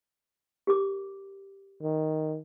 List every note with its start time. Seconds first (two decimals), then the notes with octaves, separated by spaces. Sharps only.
0.67 G4 A#4 D6
1.82 D#3